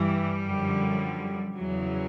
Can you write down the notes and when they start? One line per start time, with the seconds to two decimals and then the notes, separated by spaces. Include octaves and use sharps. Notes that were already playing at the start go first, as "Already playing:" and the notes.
Already playing: G2 E3 G3
0.48 F#2 D3 F3
1.57 E2 C#3 E3 F#3